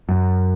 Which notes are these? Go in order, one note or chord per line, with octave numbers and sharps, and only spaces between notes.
F#2